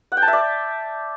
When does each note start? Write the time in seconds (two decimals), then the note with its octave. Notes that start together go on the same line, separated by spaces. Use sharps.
0.12 F#5
0.17 G5
0.22 A5
0.28 E5
0.33 D5